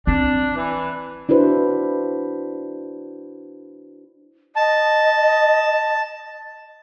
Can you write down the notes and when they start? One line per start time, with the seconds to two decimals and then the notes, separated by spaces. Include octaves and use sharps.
0.07 C4 D4
0.56 E3
1.29 D4 E4 F#4 B4 C5
4.56 D#5 A5